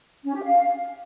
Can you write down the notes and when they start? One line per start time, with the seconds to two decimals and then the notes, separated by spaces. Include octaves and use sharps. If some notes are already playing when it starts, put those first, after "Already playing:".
0.24 C#4
0.34 G4
0.44 F5